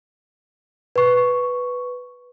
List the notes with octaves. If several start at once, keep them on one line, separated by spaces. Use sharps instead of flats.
B4 C#6